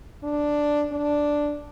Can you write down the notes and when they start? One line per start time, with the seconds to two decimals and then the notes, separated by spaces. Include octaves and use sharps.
0.23 D4
0.92 D4